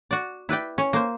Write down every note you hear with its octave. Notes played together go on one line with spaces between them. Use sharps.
F#4 D5
E4 B4 D5 G5
C#4
A#3 C5